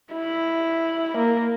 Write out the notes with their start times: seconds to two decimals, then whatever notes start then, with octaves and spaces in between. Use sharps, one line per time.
0.14 E4
1.18 A#3